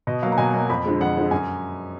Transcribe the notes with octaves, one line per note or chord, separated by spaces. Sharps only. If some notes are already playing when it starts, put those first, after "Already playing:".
B2 D#5
F#3 A#3 F5
A#5
B2 G#5
F#3 A#3
F2 B5
D3 F3 G#3
F2 F#5
D3 F3 G#3
F#2 G#5